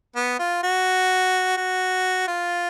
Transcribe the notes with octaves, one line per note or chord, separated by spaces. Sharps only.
B3
F4
F#4
F#4
F4